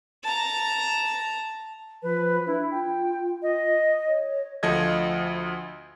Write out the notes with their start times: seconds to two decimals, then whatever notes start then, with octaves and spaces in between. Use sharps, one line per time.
0.24 A5 A#5
2.03 F3 B4
2.46 D4 E4
2.71 F4 G5
3.43 D#5
4.07 C#5
4.63 D2 F3 A4 D#5 G#6